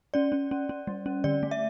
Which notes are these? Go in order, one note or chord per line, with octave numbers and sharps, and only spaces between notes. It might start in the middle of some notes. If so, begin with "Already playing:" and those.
C#4 D5
C#4
C#4
C#4
G3
C#4
D3 D5
A3
E5